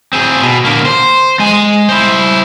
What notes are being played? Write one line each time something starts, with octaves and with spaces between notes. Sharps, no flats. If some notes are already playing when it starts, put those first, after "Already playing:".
C4 G#4
B2
D3 A#3
C5
G#3 G#5
E4 C5